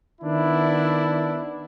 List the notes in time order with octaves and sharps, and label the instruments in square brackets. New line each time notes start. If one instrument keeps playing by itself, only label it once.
[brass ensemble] D#3 B3 D4 E4